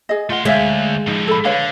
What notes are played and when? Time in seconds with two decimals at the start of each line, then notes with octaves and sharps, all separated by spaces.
0.09 G#4 D#5
0.30 A3 F4 F#5 C6
0.45 D2 G#3 C#5 E5 F5
1.08 A2 F3 D#4
1.28 A4 B5
1.45 D3 B4 C#5 F5